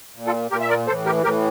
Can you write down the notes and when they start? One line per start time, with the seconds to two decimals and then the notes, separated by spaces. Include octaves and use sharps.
0.15 A#2
0.26 F4 A4
0.51 A#2 G4 A#4
0.61 E5
0.69 A#4 D5
0.87 A2 E3 A4 C5
1.06 G4 A#4
1.23 A2 E3 G4 A#4